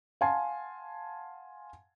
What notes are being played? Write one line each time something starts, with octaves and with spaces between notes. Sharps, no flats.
F5 F#5 G#5 A5 C6